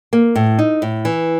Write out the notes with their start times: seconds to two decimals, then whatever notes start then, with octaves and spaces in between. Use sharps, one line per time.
0.13 A#3
0.35 A2
0.59 D#4
0.82 A2
1.05 E3